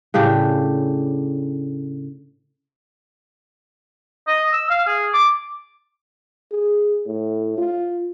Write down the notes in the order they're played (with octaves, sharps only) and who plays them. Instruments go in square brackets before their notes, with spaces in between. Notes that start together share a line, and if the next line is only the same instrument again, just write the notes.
[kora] A2 C#3 D4 G4
[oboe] D#5
E6
F5
G#4
D6
[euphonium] G#4
A2
F4